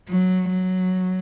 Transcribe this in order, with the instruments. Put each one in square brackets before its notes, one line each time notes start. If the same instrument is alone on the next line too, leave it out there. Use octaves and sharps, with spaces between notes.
[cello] F#3
F#3